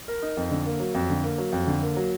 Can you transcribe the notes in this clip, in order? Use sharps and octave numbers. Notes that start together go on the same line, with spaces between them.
A#4
D#4
F2
D3
A#3
F#3
F2
D3
A#3
F#3
F2
D3
A#3
F#3